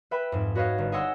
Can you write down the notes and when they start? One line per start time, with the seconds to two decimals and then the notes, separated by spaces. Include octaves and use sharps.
0.11 B4 E5 G5 B5
0.32 F2 G#2
0.55 F#4 B4 C#5 D#5 F5
0.78 G1
0.92 G#4 C#5 D#5 F#5 C6 E6